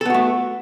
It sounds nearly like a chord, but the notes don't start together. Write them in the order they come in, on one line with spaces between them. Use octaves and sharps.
A4 B3 F#4 A3